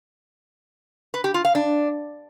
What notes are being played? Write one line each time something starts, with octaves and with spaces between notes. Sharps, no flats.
B4
G4
F4
F5
D4